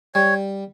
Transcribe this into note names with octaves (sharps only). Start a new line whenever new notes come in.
G3 C#5